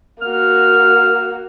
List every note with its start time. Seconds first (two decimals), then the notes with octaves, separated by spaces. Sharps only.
0.21 A#3 F#4 F6